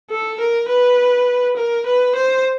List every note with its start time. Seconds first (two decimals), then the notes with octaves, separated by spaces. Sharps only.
0.10 A4
0.40 A#4
0.68 B4
1.56 A#4
1.86 B4
2.15 C5